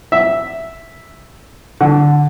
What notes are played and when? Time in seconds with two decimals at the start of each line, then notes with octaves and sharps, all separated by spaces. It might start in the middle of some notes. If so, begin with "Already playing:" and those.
0.12 E5
1.81 D3